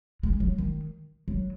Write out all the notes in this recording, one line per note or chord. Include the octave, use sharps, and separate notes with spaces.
G#3
F#3
D#3
F#3